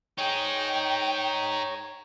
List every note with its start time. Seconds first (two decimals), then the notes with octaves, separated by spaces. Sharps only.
0.18 D#4 G#4 C#5 G5